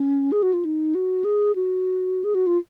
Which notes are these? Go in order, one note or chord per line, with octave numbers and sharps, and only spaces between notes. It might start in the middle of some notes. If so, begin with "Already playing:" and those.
Already playing: C#4
G#4
F#4
F4
D#4
F#4
G#4
F#4
G#4
F#4
F4